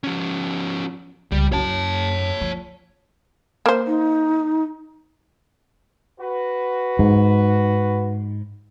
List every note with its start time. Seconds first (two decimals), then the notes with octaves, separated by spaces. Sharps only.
0.04 F3 C#4
1.31 C#2 G3
1.52 F#2 C#4 C#5 A5
2.41 F3
3.66 A#3 C5
3.87 D#4
6.18 F#4 B4
6.99 G#2